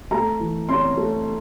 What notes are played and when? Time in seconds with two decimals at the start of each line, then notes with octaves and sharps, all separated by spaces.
0.11 A3 A#5
0.40 E3
0.69 C#4 C6
0.97 A3